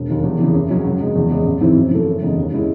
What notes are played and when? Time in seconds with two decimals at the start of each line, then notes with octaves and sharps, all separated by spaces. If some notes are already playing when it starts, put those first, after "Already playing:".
Already playing: E1
0.09 D#2 D#3
0.24 E2
0.39 C#3 E3
0.54 F#1
0.70 F#2 C#3 F#3 C#4
0.85 C#2
1.01 C#3 G#3
1.15 E2
1.30 C#3 G#3
1.45 A1
1.60 G#2 E3 C4 E4
1.77 F#2
1.91 E3 A3
2.06 F#1
2.22 E2 C#3 G#3 D#4
2.37 D#2
2.52 C#3 G#3 C#4 E4